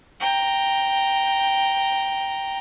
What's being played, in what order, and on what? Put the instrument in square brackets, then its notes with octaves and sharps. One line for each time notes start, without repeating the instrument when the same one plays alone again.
[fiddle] G5 A#5